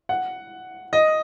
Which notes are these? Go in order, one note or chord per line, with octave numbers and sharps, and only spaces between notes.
F#5
D#5